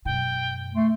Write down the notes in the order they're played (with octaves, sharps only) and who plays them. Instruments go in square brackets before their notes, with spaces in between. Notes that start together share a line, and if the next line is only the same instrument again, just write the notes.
[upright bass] F#2 B2 [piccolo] G5
[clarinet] A3 [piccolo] C6